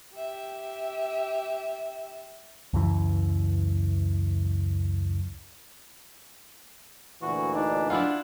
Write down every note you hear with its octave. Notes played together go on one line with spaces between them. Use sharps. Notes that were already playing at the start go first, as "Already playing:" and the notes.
G4 E5
C#2 F#2 E3
D2 A#2 E3 F#4
D4 D#4
D4 E4 F4 F#5